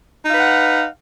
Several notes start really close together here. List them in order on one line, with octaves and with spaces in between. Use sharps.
D#4 F5 B4 F#5